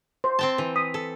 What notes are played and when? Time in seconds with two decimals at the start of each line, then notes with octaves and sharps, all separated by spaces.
0.24 C5 C6
0.39 C4 G5 A5
0.58 E3
0.76 D#6 B6
0.94 A4